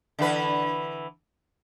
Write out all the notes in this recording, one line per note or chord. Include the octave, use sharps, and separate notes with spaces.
D3 E3 B4